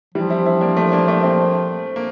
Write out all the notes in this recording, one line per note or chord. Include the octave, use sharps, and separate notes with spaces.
E3 F3 G3
C4 E4
C4 E4
A#3 D4
A3 C4
A#3 D4
A3 C4
A3 C4
A#3